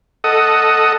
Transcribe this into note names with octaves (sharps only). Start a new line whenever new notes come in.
A4 D#5 F#5 D#6